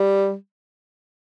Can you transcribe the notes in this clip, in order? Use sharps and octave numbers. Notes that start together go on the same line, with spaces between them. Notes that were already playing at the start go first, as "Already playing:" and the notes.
Already playing: G3